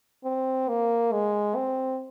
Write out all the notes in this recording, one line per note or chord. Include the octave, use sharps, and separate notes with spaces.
C4
A#3
G#3
C4